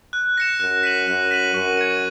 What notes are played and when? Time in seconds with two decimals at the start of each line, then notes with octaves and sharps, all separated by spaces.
0.13 F#6
0.37 A#6 C#7 E7
0.60 F#2 F#6
0.83 B6 D#7 F#7
1.08 F#2 F#6
1.31 B6 D#7 F#7
1.54 F#2 C#6
1.77 G#6 C#7